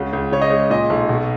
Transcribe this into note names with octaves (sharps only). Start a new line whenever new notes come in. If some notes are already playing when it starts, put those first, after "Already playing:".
Already playing: C#2 C#3 F#4
C#2
C#3 C#5
D#5
G#3 C#5
A#2 D#5
B1
B2